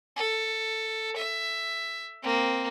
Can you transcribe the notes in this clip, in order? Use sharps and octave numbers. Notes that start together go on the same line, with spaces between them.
A4
E5
A#3 C4